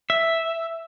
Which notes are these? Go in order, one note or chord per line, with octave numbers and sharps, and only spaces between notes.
E5